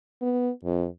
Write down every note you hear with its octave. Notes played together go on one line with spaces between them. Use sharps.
B3
F2